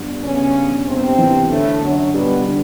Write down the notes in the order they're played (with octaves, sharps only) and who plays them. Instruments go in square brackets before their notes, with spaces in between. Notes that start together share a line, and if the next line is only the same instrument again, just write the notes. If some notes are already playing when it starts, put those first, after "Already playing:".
Already playing: [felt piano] G2 G3 B3
[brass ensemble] C#3 C#4 [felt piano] B3
[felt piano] B3
[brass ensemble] C3 C4 [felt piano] B3
[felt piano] E3
[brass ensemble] A2 A3 [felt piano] D3
[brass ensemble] F#2 F#3 [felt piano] D3
[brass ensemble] B2 B3 [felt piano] G3
[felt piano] D3